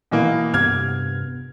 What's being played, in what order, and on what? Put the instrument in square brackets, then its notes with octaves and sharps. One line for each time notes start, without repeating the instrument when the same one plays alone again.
[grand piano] B2 E3 A#3
[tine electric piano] G2 C3 B3 [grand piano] F6 G#6